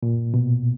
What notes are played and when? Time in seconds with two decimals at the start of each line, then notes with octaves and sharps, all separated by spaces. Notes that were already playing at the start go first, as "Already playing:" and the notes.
0.03 A#2
0.34 B2